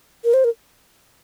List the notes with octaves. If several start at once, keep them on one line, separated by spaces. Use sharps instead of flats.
A#4
C5
A#4